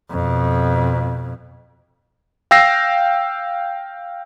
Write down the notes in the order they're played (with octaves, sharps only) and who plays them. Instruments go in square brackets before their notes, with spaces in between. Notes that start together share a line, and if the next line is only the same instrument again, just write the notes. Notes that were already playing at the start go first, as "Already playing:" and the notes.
[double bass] F2 B2
[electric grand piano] F5 G5 E6 A#6 C7